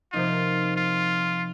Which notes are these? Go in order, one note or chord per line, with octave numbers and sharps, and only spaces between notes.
C3 F3 A#3 D#4 F4
F4